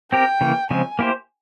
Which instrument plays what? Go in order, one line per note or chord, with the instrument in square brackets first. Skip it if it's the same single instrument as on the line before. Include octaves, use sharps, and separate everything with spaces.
[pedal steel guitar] C4 G4 A#4 [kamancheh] G5
[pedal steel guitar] C#3 E3 A#3
[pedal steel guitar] C#3 F3 G#3 C4 [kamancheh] G#5
[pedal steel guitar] A#3 E4 G4 C5